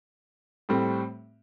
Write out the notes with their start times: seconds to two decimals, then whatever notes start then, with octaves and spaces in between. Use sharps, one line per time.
0.69 A2 G3 C4